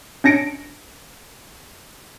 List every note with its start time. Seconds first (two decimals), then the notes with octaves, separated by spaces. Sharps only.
0.24 C#4 D4 A#6 C#7 D7